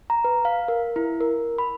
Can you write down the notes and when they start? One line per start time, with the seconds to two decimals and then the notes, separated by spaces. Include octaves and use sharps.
0.10 A#5
0.24 B4
0.45 F5
0.68 A#4
0.96 E4
1.21 A#4
1.58 B5